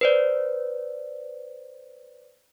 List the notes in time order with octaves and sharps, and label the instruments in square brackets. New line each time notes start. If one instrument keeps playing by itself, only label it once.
[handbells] B4 C5 D5